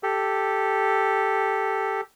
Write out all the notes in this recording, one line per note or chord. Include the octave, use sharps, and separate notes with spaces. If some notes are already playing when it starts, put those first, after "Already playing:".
G4 A4